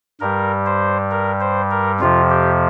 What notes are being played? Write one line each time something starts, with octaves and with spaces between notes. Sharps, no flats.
G2 G3 A#4
C5
A#4
C5
A#4
F2 C3 F3 F4
G4